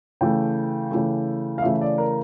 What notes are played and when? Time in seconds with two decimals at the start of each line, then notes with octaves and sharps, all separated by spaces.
0.21 C#3 E3 A3 G5
0.91 C#3 E3 A3
1.58 F5
1.62 C#3 E3 A3 E5
1.81 D5
1.98 A#4